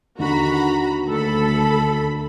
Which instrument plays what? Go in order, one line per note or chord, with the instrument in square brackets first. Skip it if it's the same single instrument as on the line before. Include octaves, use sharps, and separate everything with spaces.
[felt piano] D#2 D3 D#3 [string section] F#4 A#5 B5
[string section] D2 B5 [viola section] A4